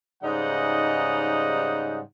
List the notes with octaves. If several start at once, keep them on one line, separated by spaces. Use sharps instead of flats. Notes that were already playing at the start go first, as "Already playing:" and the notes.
G#2 C#3 G3 D#4 D#5 F#5